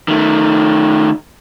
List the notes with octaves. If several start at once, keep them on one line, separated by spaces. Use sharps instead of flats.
D#3 A3